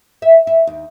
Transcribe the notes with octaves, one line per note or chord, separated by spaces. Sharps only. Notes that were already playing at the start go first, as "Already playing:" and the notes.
E5
E4
D#2